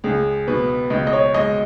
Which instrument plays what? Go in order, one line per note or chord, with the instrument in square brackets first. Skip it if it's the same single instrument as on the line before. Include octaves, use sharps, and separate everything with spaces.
[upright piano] C#2 [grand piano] G#4
[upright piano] B2 [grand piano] B4
[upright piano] C#2 [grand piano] D#5
[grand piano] D#5
C#5
[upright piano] G#3 [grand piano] D#5